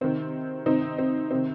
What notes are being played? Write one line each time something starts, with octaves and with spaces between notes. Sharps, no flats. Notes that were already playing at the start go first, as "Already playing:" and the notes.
C3 D#3 C4
C3 D#3 C4 D#4
C4
C3 D#3 C4